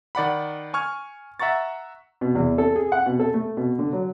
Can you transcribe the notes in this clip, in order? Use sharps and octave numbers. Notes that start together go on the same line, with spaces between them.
D#3 D5 F#5 B5
G#5 C#6 F6 G#6
E5 F#5 A#5 C#6 A6
B2
E2
A4
G#4
F#5
B2
A4
A3
B2
D3
F#3